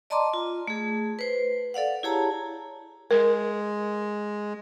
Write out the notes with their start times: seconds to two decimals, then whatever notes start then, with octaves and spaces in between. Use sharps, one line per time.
0.10 D5 D#5 A5 A#5 C6 D6
0.34 F4
0.68 A3 G#4
1.19 B4 C5
1.74 A4 D5 F5 F#5
2.03 E4 G4 G#4 C#5 A5 A#5
3.11 G#3 A#4